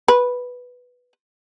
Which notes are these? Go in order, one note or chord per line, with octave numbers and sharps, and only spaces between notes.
B4